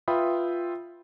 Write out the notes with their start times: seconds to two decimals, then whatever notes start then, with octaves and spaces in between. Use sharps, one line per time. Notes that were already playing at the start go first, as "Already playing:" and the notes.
0.08 F4 B4 E5 G5 B5 D#6